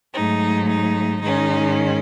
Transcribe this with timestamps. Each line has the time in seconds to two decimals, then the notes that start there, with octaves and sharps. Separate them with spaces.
0.14 G#2 F#3 A3 D#4
0.68 D#4
1.22 G#2 D#3 G#3 C#4 D#4